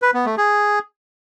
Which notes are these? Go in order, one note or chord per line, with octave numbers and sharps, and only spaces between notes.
B4
B3
A3
G#4